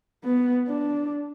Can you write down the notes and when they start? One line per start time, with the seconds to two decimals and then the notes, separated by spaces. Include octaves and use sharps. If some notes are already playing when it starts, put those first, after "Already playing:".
0.25 B3
0.68 D4